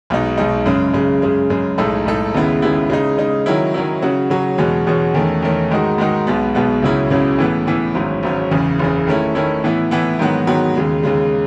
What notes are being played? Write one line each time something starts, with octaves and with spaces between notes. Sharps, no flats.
B1 B2 G#3 D#4
B1 B2 G#3 D#4
F#2 C#3 G#3
F#2 C#3 G#3
F#2 C#3 G#3
F#2 C#3 G#3
B1 A2 G#3 D#4 A4
B1 A2 G#3 D#4 A4
D#2 C#3 G#3 B3 E4
D#2 C#3 G#3 B3 E4
C#3 G#3 D#4
C#3 G#3 D#4
D#3 F#3 C#4 E4
D#3 F#3 C#4 E4
C#3 F#3 C#4 F#4
C#3 F#3 C#4 F#4
E2 B2 G#3 C#4 F#4
E2 B2 G#3 C#4 F#4
E2 D#3 A3 C#4
E2 D#3 A3 C#4
G#2 D#3 G#3 D#4 F#4
G#2 D#3 G#3 D#4 F#4
B1 B2 G#3 B3
B1 B2 G#3 B3
C#2 C#3 F#3 C#4 E4
C#2 C#3 F#3 C#4 E4
A2 E3 B3
A2 E3 B3
G#1 G#2 F#3 C#4
G#1 G#2 F#3 C#4
F#1 E2 C#3
F#1 E2 C#3
D#3 A3 C#4 E4
D#3 A3 C#4 E4
A2 E3 B3 E4
A2 E3 B3 E4
G#2 D#3 F#3 B3 F#4
G#2 D#3 F#3 B3 F#4
D#2 C#3 G#3
D#2 C#3 G#3